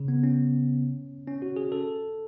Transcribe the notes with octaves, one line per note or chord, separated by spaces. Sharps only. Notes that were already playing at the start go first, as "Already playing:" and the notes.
Already playing: C#3
B3
C#4
C#4
F#4
G#4
A4